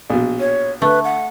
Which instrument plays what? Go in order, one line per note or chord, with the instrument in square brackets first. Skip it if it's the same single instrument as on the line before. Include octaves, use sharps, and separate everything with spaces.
[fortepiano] A#1 B2
[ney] C#5
[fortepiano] D3 [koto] A3 [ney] B4
[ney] F#5